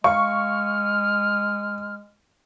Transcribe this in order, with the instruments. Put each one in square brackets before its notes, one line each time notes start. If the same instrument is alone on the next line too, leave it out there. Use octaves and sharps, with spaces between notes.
[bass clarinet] G#3 [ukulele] F5 [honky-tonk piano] C#6 [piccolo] F6